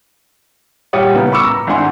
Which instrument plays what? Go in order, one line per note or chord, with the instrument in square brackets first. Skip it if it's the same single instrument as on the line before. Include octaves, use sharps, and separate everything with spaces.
[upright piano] A#2 G3 G4 C#5 F#5 D#6
A2 C#3 A#3 B3
B5 C#6 D6 E6 C#7
A#5
G#1 A2 D4 F#5 G#5 C6